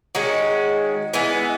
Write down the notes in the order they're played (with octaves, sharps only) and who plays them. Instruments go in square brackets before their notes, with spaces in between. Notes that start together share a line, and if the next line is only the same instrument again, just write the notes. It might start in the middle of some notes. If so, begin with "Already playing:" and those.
[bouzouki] D#3 G#3 C#4 F#4
E3 G#3 B3